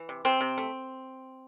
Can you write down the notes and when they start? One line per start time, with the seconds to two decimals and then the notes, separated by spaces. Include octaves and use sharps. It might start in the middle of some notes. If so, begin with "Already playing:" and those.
Already playing: E3
0.09 C3
0.25 C3 C4
0.41 C3
0.58 A3